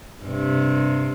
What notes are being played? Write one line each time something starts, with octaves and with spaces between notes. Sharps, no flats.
G2 C3